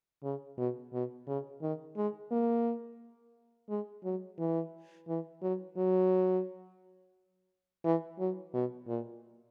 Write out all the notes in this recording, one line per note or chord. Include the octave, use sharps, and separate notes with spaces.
C#3
B2
B2
C#3
D#3
G#3
A#3
G#3
F#3
E3
E3
F#3
F#3
E3
F#3
B2
A#2